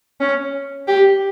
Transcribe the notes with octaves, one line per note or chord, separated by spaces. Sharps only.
C#4
G4